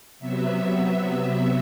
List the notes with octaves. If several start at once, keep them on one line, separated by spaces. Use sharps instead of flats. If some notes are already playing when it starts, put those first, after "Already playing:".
C3 F#3 B3 E5